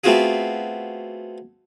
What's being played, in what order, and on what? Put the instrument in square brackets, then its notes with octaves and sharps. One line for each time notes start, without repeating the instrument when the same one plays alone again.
[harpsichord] A3 B3 C4 F4 F#4 G#4